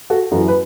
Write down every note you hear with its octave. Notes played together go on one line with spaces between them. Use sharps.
F#4 A4
F#2 E3 F#4 A4
B4